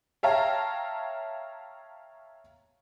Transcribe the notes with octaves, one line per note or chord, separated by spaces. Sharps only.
C#5 E5 F5 G5 A5 A#5